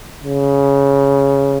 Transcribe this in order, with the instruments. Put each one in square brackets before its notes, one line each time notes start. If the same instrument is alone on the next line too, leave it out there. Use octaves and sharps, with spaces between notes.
[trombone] C#3